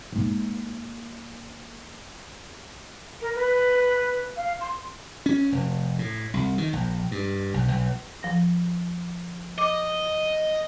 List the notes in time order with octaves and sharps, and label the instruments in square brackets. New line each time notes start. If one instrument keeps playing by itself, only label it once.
[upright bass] G#2 A#3
[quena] A#4
B4
F5
C6
[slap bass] C#4
F1
A2
C2
D#3
A#1
G2
B1
B1
[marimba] F3 A#6
[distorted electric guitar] D#5 [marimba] D6